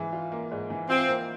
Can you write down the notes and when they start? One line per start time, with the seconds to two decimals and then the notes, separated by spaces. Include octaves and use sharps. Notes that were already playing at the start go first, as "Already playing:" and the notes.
Already playing: G#2 E3
0.13 F4
0.32 A#3
0.51 G#2
0.70 E3
0.89 C4 F4
1.09 A#3